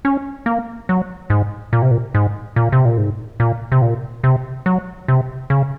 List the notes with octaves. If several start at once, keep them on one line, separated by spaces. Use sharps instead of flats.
C#4
A#3
F#3
G#2
A#2
C3
A#2
G#2
A#2
C3
A#2
G#2
A#2
C3
A#2
C3
F#3
C3
C#3